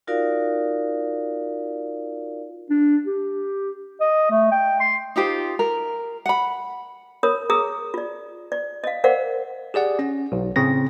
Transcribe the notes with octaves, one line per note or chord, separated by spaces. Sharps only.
D#4 F4 F#4 A#4 D5 F5
D4
G4
D#5
A3
G5
C6
D#4 F4 G4 C5
A#4
F#5 B5
A#4 C#5 B5 D#6
G#4 A#5 D#6 E6
F4 D5
D5
D#5 F5
A#4 C5 D5 F5 F#5
G4 G#4 D5 F#5
C#4
B1
A2 C#3 C4 A#6